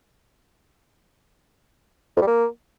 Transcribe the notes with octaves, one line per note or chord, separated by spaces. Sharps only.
F2
G3
A#3